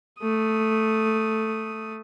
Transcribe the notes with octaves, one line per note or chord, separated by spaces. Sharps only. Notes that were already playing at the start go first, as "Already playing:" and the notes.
A3 D#6